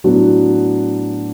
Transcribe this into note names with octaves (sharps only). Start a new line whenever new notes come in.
A2 F#3 B3 D4 F#4